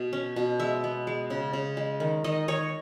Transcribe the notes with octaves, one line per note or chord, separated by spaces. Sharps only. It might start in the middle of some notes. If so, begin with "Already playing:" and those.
Already playing: B2
C#4
B2
G#3 E5
B3
G#3
C#3
C#3
G#3
D#3
D#3 D#5
D#3 C#5